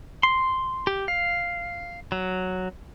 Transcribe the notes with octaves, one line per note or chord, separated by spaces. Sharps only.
C6
G4
F5
F#3